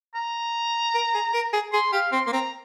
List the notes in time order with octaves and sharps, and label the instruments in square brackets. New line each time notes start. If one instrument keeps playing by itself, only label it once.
[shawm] A#5
[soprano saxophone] A#4
G#4
A#4
G#4
[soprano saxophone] G#4 [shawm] C6
[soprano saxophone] G4 [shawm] F5
[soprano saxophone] C4 [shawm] C6
[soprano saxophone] A#3 [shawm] C6
[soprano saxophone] C4 [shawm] A#5